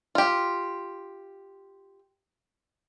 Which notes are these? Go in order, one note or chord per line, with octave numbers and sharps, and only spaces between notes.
F4 G4